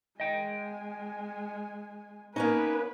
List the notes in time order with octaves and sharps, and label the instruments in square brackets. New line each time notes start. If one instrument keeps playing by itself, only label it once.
[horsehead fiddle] G#3 G#5 [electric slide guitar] D#5 G5
[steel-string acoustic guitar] A#3 B3 C#4 [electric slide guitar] D#4 [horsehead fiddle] B4